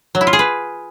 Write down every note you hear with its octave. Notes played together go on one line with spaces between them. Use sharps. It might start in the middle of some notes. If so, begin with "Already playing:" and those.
F#3
E4
F4
G#4
B4